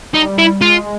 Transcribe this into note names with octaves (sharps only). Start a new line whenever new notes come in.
G3 D#4
E4
G#3 F4